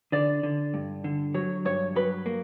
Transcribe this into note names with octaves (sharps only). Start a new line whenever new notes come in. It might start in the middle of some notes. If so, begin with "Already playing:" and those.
D3 D5
D3
G2
D3
F#3 C#5
G2 C#5
F#3 B4
A#3